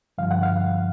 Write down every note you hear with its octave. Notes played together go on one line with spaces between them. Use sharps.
G2 D3 F3 F5
F#5
F5